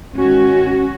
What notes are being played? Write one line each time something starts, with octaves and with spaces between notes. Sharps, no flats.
G#2 D#3 G#3 C#4 F#4